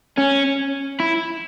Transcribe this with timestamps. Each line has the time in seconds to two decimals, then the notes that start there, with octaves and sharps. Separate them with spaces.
0.17 C#4
1.00 E4